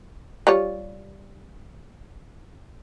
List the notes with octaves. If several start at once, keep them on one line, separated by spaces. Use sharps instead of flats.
G3 F4 C#5